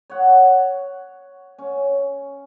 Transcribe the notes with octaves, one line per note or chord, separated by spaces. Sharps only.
C#5 F#5
C#4